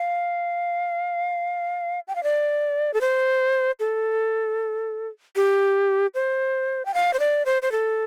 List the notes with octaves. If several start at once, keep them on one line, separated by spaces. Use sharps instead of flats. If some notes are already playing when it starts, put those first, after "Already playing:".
Already playing: F5
G5
F5
D5
A4
C5
A4
G4
C5
G5
F5
C5
D5
C5
C5
A4